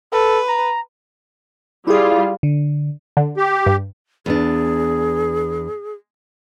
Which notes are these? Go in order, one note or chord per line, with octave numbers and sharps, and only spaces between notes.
A4 B4
A#5
G3 E4 F4 G#4
D3
D3
G4
G2
E2 B3 D4 G#4